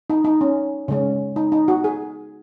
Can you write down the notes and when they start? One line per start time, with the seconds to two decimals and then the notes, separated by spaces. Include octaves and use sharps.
0.10 D#4
0.24 D#4
0.41 C#4
0.88 C#3 G#3 C#4
1.36 D#4
1.52 D#4
1.68 F#4
1.84 G#4